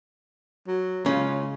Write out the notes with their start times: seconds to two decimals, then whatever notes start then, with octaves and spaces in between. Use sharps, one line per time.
0.67 F#3
1.06 C#3 G#3 C#4 F4